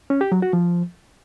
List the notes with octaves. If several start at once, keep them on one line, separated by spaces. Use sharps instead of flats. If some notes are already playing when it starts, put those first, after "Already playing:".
C#4
G4
F#3
F#4
F3